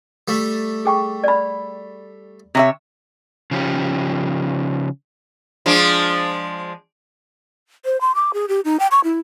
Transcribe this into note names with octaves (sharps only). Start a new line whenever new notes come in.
G3 A3
G#4 G5 C#6
D5 B5
C3 C#5 E5
C#3 F3 C#4 G4
F3 G#3 D4
C5
C6
D6
G#4
G4
D#4
G5
C#6
E4